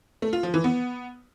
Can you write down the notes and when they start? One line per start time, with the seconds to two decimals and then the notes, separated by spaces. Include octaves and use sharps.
0.22 A3
0.33 F4
0.43 F3
0.54 E3
0.64 B3